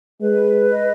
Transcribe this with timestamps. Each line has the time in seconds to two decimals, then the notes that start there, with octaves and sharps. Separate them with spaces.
0.21 G#3 B4
0.68 D#5